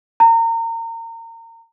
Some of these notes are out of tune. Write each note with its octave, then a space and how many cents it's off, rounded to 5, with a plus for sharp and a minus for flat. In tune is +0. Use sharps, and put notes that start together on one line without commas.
A#5 -30